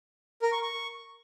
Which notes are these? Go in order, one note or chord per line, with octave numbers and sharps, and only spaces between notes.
A#4
C#6
C#6